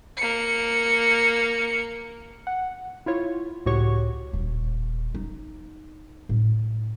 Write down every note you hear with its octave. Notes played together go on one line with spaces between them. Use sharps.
A#3 C#7
F#5
E4 F4 C#5
C#2 A2 F#4 G4 C#5 C#6
D#1
D#4
A2